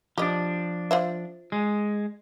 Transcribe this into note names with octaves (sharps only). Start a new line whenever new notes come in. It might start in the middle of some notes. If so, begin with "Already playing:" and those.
F3 D4 G4 D#5
F4 C5 E5
G#3